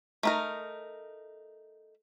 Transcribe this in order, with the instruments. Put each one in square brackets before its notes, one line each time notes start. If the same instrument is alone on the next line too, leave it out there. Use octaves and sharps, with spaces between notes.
[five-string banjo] A3 D#4 A#4